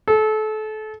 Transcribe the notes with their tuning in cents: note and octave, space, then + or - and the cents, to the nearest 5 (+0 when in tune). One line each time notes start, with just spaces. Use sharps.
A4 -30